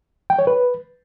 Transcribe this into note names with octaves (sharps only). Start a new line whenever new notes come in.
G5
C#5
B4